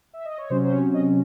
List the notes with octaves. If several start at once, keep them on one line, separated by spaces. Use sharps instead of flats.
E5
D#5
C#5
C3 F#3 C#4 C5
C5
C#5
D#5